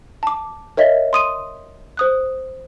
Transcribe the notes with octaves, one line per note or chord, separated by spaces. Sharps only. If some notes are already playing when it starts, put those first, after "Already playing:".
A5 D6
A#4 C#5 D#5 E5
C6 D#6 D#7
C5 D#6 F#6